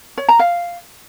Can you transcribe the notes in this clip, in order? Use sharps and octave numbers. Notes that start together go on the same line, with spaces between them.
C#5
A#5
F5